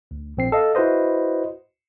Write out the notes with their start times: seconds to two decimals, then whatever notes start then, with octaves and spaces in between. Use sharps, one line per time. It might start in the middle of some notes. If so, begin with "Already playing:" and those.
0.11 D2
0.37 A#1 C4 C7
0.52 A4 D#5 F5
0.75 E4 F#4 B4 C5 D#5